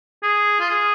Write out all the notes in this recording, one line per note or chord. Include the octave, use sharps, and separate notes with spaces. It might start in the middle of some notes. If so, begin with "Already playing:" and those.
G#4
F4
G#4